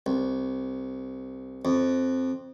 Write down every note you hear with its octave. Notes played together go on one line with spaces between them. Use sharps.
C2
F2